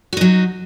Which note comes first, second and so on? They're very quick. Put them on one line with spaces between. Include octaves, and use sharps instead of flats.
F#4 D#4 F#3